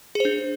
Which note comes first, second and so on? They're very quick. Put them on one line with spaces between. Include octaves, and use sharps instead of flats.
G#4 C5 D4